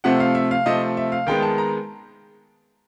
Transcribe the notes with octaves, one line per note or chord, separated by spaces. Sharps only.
C3 F3 A3 C4 F#5
F5
E5
F5
C3 F3 A3 C4 D#5
E5
F5
D#3 G#3 B3 G5
A5
A#5